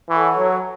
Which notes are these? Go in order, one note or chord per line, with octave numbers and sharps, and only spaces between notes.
E3 A4 C#5 F#5 C#6
F#3